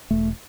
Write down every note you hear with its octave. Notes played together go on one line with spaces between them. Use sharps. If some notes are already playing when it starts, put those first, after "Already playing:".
E1 A3